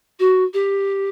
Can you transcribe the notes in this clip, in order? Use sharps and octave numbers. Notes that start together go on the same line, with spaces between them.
F#4
G4